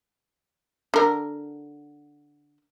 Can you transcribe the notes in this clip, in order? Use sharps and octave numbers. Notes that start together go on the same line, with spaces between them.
D3 A#4